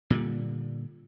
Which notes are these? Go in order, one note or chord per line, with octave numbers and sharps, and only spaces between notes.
A#2 D3 G3